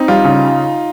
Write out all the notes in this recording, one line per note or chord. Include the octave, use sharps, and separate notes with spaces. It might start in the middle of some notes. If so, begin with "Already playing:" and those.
Already playing: C4 D#4
G3 F4
C#3